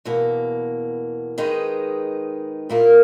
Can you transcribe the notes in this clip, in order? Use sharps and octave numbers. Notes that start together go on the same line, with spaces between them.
E2 B2 A#3
D#3 G#3 D#4 G#4 B4
A#2 A#3 E4 A#4